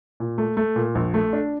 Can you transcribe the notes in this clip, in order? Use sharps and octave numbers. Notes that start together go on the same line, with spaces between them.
A#2
A3
A3
A#2
A#1
A3
D4